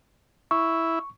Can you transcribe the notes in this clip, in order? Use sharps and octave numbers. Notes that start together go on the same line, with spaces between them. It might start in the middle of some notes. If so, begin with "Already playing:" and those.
E4 C#6